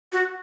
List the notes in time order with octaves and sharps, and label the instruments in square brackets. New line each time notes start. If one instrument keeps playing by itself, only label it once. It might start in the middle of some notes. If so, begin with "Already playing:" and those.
[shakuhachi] F#4